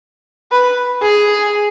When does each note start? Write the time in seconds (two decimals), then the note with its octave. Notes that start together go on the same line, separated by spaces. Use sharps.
0.52 B4
1.02 G#4